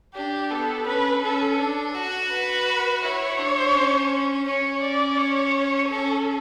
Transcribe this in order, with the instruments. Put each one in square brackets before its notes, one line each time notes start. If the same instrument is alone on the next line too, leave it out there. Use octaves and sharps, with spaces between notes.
[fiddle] D4 [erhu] G4
[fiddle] B3 [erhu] A4
[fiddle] C#4 [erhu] B4
[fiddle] C#4 [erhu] A4
[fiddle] D4
F#4
[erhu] B4
[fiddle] E4 [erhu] C#5
[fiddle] D4
C#4
[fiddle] C#4 [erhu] C#5
[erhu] D5
C#5
[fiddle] C#4 [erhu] A4